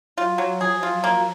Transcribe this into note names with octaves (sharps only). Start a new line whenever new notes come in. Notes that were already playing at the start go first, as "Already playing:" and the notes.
F#3 F4
F#3
F3 G#4
F4
F#3 A#3